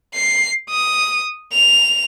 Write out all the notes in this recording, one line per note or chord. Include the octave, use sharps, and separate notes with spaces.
C7
D#6
F7